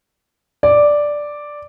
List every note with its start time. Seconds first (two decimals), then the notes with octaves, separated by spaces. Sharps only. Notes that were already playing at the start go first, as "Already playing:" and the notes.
0.63 D5